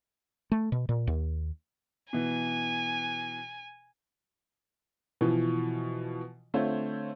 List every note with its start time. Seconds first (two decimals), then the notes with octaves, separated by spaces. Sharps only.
0.52 A3
0.72 B2
0.89 A#2
1.07 D#2
2.13 B2 E3 G#5
5.21 B2 E3 F3
6.54 D3 A3 C4 F4 C5 C#5